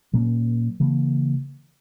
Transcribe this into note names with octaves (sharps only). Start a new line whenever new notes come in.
A#2 F#3 A#3 C#4
C#3 E3 A#3